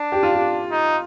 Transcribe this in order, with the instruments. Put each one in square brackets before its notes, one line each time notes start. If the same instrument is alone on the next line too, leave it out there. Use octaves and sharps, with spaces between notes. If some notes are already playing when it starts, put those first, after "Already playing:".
Already playing: [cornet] D4
[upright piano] G4
F4
G4
[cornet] D#4